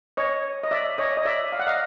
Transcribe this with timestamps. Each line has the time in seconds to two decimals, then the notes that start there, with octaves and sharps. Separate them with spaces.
0.17 C#5 D#5
0.63 D#5
0.71 D5 E5
0.98 C#5 D#5
1.17 D#5
1.25 D5 E5
1.52 F5
1.59 F#5
1.67 D#5 F5